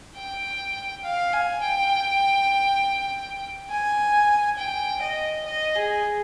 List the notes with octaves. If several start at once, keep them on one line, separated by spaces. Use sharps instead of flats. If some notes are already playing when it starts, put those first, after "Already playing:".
G5
F5
G#5
G5
G#5
G5
D#5
D#5
G#4